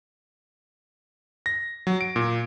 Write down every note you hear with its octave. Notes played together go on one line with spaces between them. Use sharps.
A#6
F#3
D7
A#2